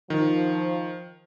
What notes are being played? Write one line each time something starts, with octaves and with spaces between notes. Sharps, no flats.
D#3 F3